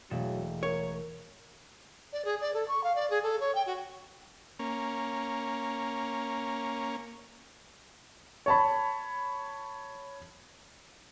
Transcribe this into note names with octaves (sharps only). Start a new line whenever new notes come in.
E1 F#3 A3 E7
A#4 C#5
D5
G#4
D5
A4
C#6
F5
D5
G#4
A4
C#5
G5
F#4
A#3 C#4
C#5 A5 B5